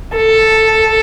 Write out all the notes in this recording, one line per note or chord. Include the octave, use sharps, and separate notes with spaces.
A4